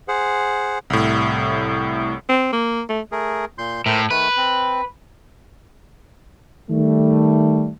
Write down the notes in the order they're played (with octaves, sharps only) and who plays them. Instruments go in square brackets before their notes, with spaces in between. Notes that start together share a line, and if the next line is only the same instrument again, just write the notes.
[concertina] G#4 C5 F#5
[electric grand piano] C2 A2
[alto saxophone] C4
A#3
A3
[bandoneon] A3 G#4 A#4
A#2 C6 G6
[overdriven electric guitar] A2 [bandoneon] A#4 C5 E5
[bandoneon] D#3 A3 [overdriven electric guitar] B4
[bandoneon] C4
[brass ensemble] D#3 G3 A3